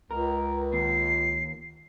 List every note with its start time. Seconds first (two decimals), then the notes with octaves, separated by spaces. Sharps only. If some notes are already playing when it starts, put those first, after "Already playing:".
0.11 C#2 A#4
0.73 D#2 C7